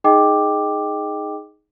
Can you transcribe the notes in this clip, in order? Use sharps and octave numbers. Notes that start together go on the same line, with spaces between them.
D#4 G#4 D#5 G5 D6